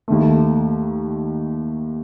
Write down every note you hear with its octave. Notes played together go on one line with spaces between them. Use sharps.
D#2 D#3 A3